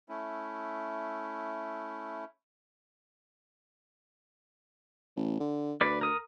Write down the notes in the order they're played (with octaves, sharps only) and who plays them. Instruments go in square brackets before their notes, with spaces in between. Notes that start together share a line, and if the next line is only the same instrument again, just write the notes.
[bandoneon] A3 C#4 E4
[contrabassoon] A1
D3
[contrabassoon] D2 [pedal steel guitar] B4 D5
[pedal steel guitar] A#4 D#6